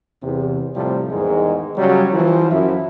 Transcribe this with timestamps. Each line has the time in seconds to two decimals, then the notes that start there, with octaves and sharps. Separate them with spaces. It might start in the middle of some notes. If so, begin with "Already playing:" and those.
0.22 E2 C3
0.74 A2 C3 F3 G3
1.09 E2 G#2 D#3 G#3
1.76 C#3 F#3 G3
2.13 E3 F3
2.50 F#2 E4